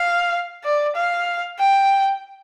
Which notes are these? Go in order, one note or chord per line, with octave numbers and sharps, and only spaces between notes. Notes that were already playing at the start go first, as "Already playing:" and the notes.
Already playing: F5
D5
F5
G5